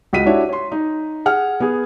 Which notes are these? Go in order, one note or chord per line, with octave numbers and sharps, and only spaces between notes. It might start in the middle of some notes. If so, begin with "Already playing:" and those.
C#2 F#4 D#5 B6 D#7
D4 E4 F#4 G4 C#5 E5
C#5 C6
D#4
G#4 F#5 F6
B3 G#4